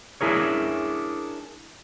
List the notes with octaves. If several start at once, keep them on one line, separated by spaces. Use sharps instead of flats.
D4 E4 G#4 A#4 C#5